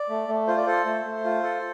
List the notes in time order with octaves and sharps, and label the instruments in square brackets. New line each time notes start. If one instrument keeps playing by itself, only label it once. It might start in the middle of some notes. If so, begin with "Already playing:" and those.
Already playing: [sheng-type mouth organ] D5
A3
A3
F4 C5
D5
A4 C5
A3
A3
F4
A4